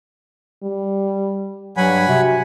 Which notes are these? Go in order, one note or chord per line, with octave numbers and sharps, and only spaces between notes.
G3
G2 F#3 F#5 G#5 B5
C3 F#4